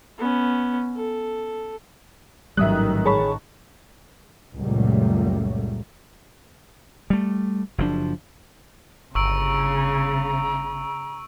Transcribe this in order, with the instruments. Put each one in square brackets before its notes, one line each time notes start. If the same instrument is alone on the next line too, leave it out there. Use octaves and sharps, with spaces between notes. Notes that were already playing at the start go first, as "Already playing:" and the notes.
[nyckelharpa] B3 C#4
A4
[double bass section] A1 D#3 [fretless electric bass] G#2 F#3 G3 [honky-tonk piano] E5 D#6 F#6
[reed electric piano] G#4 C#5 B5 [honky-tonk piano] A5 C#6
[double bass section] C#2 F#2 A#2 F#3 G3 A3
[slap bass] G3 A3
F#1 F3 D4
[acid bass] G1 [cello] C#3 [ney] A#5 [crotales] C#6 E6 D7